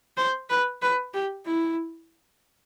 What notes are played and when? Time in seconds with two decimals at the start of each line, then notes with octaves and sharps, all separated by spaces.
0.17 C5
0.50 B4
0.82 B4
1.14 G4
1.45 E4